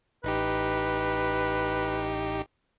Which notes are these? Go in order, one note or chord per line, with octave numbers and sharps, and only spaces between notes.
A1 D#4 G4 B4